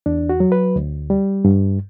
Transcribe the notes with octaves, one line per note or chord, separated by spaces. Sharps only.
E2 D4
F#4
F#3
B4
D2
G3
G2